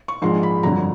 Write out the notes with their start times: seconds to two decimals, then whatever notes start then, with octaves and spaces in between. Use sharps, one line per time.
0.08 C#6
0.22 A#1 G#2 F3 G#3 C6
0.43 B5
0.63 G1 F2 D3 F#3 A#5